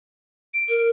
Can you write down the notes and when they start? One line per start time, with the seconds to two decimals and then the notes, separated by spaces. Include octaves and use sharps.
0.54 D7
0.69 A#4